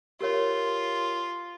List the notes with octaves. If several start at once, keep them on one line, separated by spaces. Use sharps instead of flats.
F4 G4 A#4 C#5